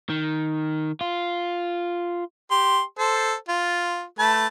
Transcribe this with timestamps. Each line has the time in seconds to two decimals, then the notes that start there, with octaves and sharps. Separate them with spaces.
0.10 D#3
1.01 F4
2.51 G4 C6
2.99 A4 C5
3.49 F4
4.19 A3 B4 A5